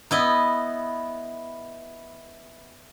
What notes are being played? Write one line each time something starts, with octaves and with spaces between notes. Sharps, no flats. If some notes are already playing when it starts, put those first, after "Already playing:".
B3 E4 D#5